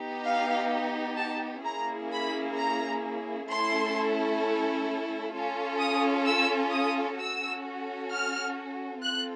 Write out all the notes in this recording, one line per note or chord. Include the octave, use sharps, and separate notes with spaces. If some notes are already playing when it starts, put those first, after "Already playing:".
Already playing: B3 D#4 G4
F5
A5
A#3 C#4 E4 G#4 A#5
B5
A#5
A3 C#4 E4 A4 C6
C#4 F4 A4
D#6
E6
D#6
C#4 F#4 A4 E6
F6
C4 F4 A4 F#6